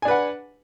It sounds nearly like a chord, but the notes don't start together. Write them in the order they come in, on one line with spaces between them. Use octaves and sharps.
G#5 D4 B4 F#5